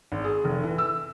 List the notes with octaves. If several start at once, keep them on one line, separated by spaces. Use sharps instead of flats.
G#1
G#4
F1
E3
E6